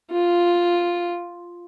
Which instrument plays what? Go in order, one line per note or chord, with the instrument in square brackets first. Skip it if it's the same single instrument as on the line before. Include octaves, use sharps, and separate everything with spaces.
[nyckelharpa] F4